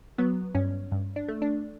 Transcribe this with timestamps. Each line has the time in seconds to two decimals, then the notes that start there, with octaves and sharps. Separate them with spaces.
0.18 F#3 B3
0.55 G2 C#4
0.92 G2
1.16 D4
1.28 A3
1.42 D4